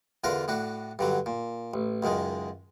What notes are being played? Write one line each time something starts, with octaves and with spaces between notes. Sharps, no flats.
E2 D3 D4 F4 A#4
A2 D4 F#4
G2 D3 F#3
A#2
A1
C#2 F#2 D#3 G#3